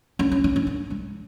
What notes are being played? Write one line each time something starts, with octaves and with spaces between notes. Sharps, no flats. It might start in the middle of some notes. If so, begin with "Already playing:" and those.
C#4
C#4
C#4
C#4
A#3
G#3